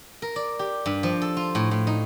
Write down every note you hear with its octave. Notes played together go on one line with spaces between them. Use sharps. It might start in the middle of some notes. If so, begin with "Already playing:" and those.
A#4
D5
G4
G2
F3
A4
F4
A2
A2
D#4